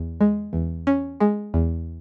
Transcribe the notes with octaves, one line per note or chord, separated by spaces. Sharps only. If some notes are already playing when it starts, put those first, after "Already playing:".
Already playing: E2
G#3
E2
C#4
G#3
E2